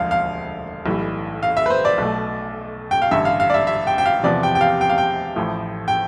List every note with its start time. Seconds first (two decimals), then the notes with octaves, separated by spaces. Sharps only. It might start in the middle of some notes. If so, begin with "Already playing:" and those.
Already playing: E1 D2 D3 F3 F5
0.11 F5
0.86 B1 A2 E3 G3
1.43 F5
1.57 E5
1.66 B4
1.70 C5
1.85 D5
1.98 B1 B2 A3
2.91 G5
3.02 F5
3.11 A1 G2 D3 E5
3.25 F5
3.40 F5
3.50 D5
3.54 E5
3.67 E5
3.87 G5
3.98 G5
4.06 F5
4.23 E2 C3 F3 B3 D5
4.43 G5
4.55 G5
4.61 F5
4.81 G5
4.90 F5
4.98 G5
5.36 A1 A2 F3
5.88 G5